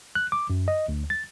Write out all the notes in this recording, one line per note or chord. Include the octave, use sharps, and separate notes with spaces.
F#6
D6
F#2
D#5
D2
A6